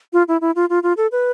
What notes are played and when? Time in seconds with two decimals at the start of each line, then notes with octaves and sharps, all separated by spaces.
0.13 F4
0.28 E4
0.41 E4
0.56 F4
0.70 F4
0.83 F4
0.97 A4
1.12 B4